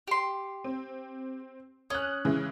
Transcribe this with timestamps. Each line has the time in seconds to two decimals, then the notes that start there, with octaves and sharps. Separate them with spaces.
0.08 G4 C6
0.64 C4
1.90 C#4 D#6 F#6
2.25 C#3 E3 G#3